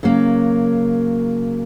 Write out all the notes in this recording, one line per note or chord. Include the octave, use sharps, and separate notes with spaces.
C#3 F#3 A#3